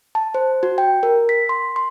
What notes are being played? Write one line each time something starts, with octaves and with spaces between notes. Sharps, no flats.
A5
C5
F#4
G5
A#4
B6
C6
C6